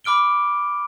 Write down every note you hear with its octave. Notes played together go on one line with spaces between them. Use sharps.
B5 D6 F6 D7 G7